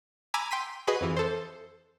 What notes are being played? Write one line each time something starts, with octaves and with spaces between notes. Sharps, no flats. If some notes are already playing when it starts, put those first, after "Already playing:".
G#5 A#5 B5 D6 E6 G#6
G5 C6 B6 D#7
F#4 G#4 B4 D#5
F2 E3
A4 C5